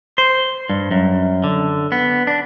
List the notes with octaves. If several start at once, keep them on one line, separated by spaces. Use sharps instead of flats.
C5
G2
F#2
D3
B3
D4